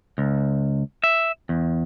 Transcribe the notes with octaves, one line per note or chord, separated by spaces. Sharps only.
C#2
E5
E2